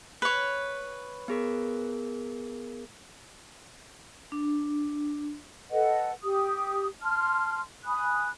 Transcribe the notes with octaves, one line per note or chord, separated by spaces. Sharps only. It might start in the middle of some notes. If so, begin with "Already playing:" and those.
B4 C#5
B3 G#4 A#4
D4
A4 B4 D#5 F#5
G4 D#6
A5 C6 F6
G#5 B5 D#6 F#6